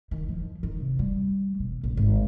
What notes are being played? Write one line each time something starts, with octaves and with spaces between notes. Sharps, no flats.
D#3
F3
D#3
C3
G3
B2
A#1
G#1